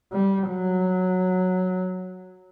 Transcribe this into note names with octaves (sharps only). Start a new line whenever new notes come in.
G3
F#3